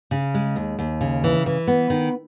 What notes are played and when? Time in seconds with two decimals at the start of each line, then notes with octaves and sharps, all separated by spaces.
0.11 C#3
0.34 G#3
0.56 D#2
0.79 D#2
1.01 C#3
1.24 E3
1.46 E3
1.67 B3
1.90 D#3